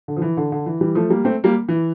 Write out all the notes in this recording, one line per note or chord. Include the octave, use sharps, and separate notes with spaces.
D3
F3
E3
D3
D3
E3
E3 G3
F3 A3
G3 A#3
A3 C4
G3 A#3
E3